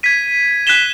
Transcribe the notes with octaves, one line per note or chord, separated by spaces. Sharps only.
G#6 B6 D#7
F#6 B6 E7 G7